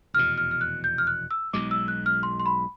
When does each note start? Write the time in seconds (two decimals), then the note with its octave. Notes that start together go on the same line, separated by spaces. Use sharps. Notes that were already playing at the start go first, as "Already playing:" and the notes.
0.14 F1 E2 B2 F6
0.38 F6
0.51 F6
0.61 F#6
0.84 G6
0.98 F6
1.07 F#6
1.31 E6
1.53 B1 B2 G#3 D6
1.71 E6
1.88 F#6
2.06 F6
2.23 C6
2.40 C6
2.46 B5